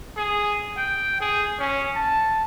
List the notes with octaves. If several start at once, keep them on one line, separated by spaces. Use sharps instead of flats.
G#4
G5
G#4
C#4
A5